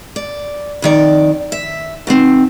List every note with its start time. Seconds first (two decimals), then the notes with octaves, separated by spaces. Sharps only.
0.16 D5
0.82 F2 D#3 D5
1.52 E5
2.07 B2 D#3 C4